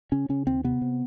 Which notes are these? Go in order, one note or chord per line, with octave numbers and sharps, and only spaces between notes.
C#3 C#4
C#3 C#4
D#2 C4
C3 B3
C3